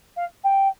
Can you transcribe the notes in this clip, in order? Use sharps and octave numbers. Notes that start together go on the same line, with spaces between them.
F5
G5